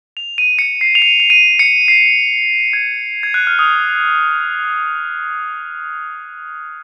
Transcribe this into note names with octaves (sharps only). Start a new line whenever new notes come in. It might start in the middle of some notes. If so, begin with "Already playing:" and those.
F7
D#7
C#7
C7
F7
D#7
F7
D#7
C#7
C7
G#6
G#6
F#6
F6
D#6